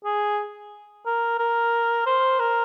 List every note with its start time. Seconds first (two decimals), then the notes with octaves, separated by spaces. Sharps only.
0.05 G#4
1.06 A#4
1.39 A#4
2.06 C5
2.40 A#4